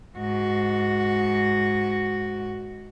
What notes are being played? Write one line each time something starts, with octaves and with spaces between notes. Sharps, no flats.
G#2 F#4